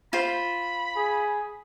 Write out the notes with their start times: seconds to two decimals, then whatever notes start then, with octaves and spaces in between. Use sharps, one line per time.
0.13 F4 C5 B5
0.96 G#4